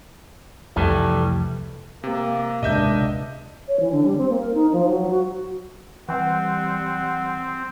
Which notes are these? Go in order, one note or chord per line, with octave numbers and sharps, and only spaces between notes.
C2 F2 E3 G3 A3
C3 A#3
D#1 G#1 C#2 C3 D4 D#5 E5 G6
C#5
E3
D3
G3
C4
A#3
A#4
D#4
F3
F#3
F#4
E3 G3 C4 F#5